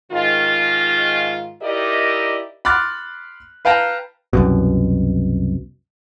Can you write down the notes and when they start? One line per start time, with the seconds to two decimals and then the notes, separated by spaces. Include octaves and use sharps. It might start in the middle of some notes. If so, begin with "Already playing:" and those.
0.12 G#2 D#3 F4
1.62 D#4 E4 G4 A#4 D5 D#5
2.65 B5 C6 D6 F6 F#6 A6
3.65 B4 F5 G5 A5 A#5
4.33 C2 F#2 B2